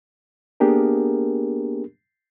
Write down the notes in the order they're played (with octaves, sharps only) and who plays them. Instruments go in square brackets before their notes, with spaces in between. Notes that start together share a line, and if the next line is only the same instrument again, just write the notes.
[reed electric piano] A#3 B3 D4 G4 G#4 A#4